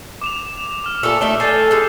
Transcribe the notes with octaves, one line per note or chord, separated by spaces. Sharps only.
D6 E7 F7
D6 F6
A#2 A3 A4 A5 E6
A3 D4 D#4 E5 F6 E7 G7
A4 G#5 G6 A6 C7
G#3 D#4